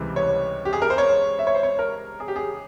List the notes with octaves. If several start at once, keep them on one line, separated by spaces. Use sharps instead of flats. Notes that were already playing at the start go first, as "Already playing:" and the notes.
Already playing: C#2 C3 E3 G3 C4
C#5
G4
G#4
A#4
C5
C#5
E5
C#5
C5
C#5
A#4
G#4
G4
G#4